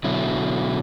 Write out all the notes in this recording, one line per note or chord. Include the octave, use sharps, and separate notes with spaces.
B2 D3 F#3 E4